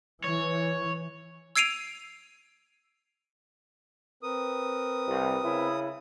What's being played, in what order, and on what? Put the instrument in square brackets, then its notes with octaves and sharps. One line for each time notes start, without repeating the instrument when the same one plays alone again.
[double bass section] E3 [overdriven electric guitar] C#5
[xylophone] E6 G#6 C7 D7 D#7 F7
[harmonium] C4 A#4 B4 [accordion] D#6
[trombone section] C2
C#3 E4